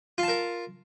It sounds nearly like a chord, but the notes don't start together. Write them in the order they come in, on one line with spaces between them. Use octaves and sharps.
F4 A5 A#4